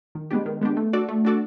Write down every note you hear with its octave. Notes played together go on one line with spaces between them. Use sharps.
D#3
G#3 B3 D4 G4
D#3
G#3 B3 D4 G4
A3
D4 F#4 A4 D5
A3
D4 F#4 A4 D5